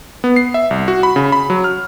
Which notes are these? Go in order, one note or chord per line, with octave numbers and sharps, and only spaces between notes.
B3
C7
E5
C2
F#4
B5
C#3
B5
F#3
F6